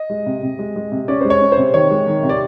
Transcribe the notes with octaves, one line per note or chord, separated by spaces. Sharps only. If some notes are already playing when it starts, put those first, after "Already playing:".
Already playing: D#5
G#3
C3
C3
G#3
G#3
C3
C#4 D5
G#3 C5
C#5
C#4
C5
C3
D#3 C#5
G#3
D#3
C3
D5